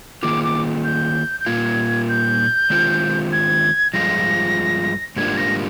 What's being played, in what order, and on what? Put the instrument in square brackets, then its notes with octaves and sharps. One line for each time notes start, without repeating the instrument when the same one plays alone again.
[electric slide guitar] D#3 A#3 F4 G#4 [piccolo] D6
[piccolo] D6
G6
G6
[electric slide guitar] A#2 G3 A#3 F4 [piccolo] G#6
[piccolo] G6
[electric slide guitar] D#3 G#3 C4 F4
[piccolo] G#6
[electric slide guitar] G2 F3 G#3 F4 [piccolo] A#6
[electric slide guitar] G#2 G3 A#3 D4 F4 [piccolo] G#6
[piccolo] A#6